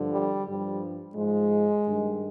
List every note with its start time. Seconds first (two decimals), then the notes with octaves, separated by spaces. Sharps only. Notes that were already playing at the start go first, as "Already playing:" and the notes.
Already playing: G2 D3 F3
0.11 G3
0.46 G2 F3 G3
1.14 G#2 F3 G#3
1.83 G2 D#3